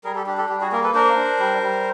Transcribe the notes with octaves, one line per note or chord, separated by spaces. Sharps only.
G3 G#4 A#4
G4 A4
D4 G4
G4 A4
G3 G4
F#4 G#4
A#3 G#4 A#4
A4 B4
D4 A#4 C5
D4
G3
G3